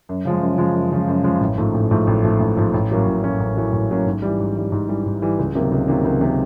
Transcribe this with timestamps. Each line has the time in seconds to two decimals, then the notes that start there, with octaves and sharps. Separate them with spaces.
0.09 F#2
0.25 C#3 F3 G#3
0.42 F#2
0.58 C#3 F3 G#3
0.75 F#2
0.92 C#3 F3 G#3
1.08 F#2
1.24 C#3 F3 G#3
1.41 A1
1.58 G#2 F3 A3
1.74 A1
1.91 G#2 F3 A3
2.07 A1
2.24 G#2 F3 A3
2.40 A1
2.57 G#2 F3 A3
2.74 A1
2.91 A2 F#3 A#3 C#4
3.07 A1
3.24 A2 F#3 A#3 C#4
3.40 A1
3.57 A2 F#3 A#3 C#4
3.73 A1
3.90 A2 F#3 A#3 C#4
4.06 G#2
4.22 E3 G3
4.40 G#2
4.56 E3 G3
4.72 G#2
4.89 E3 G3
5.06 G#2
5.22 E3 G3
5.39 C#2
5.55 C3 D#3 F#3 A#3
5.72 C#2
5.88 C3 D#3 F#3 A#3
6.05 C#2
6.21 C3 D#3 F#3 A#3